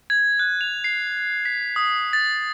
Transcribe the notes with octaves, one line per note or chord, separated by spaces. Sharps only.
G#6
F#6
F7
C7
B6
D#6
A6